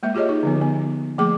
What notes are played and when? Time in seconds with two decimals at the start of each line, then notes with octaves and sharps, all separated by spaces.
0.03 G#3 A#3 E5
0.15 F4 G4 G#4 C#5 D#5
0.29 D#4
0.43 D3 F3 B3
0.61 B3
1.18 F3 A3 A#3 G#4 D6